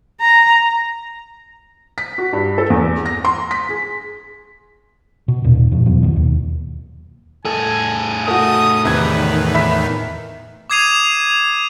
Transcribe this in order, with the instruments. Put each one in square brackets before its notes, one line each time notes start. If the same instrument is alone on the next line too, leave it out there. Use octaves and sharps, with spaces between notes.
[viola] A#5
[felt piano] B6
F#4
G2
A4
E2
A#6
C6
B6
G#4
[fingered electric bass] B2
D#2 A#2
F2 B2 F3
E2 F#3
C2 B2 D#3
D#2
[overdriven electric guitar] A2 G#4 [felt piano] A4 [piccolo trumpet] G#5
[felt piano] A3 F#4 [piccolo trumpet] D#6
[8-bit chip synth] E2 D#3 [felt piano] C3 G#6 [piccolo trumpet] B4
[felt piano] E5 B5 B6
[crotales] D6 D#6 G#6 C7 D#7 F7